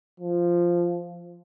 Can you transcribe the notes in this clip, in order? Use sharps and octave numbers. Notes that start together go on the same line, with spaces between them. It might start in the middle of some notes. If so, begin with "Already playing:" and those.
F3